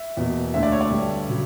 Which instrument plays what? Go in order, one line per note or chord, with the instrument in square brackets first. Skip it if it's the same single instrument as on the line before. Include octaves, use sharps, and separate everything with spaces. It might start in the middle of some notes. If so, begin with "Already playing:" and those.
Already playing: [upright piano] E5
[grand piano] E2 B2 A#3
[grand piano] D2 D3 A#3 [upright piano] E5
[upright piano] D5
C#5
D5
[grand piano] G2 D3 G3
C#3 F#3